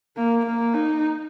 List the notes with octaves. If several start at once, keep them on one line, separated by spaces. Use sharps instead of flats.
A#3
A#3
D#4